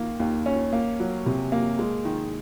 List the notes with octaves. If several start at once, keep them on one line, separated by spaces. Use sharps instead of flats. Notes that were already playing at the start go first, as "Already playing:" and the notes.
Already playing: D#3 A#3
D#2
C#4
A#3
F#3
C3
A#3
G#3
D#3